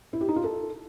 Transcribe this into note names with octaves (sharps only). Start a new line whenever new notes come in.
E4
G4
D#4
F4
A4